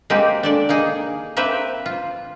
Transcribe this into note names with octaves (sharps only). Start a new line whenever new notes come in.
G#3 A#3 C4 G4 C5
D4 A4 D5
A#3 D#4 G#4
A#3 C4 B4 E5 G5
F4